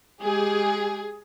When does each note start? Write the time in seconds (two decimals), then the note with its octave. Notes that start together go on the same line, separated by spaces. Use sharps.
0.22 G#3 G4 G#4